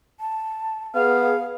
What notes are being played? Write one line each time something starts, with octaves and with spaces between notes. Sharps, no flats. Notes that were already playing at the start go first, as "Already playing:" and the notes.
A5
B3 G#4 F5